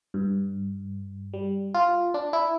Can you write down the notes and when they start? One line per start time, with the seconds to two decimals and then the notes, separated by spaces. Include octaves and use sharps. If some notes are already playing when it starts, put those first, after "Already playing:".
0.14 G2
1.33 G3
1.74 F4
2.14 D4
2.33 E4